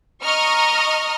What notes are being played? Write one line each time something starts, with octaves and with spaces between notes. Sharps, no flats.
D#5 A#5 C#6 D#6 F6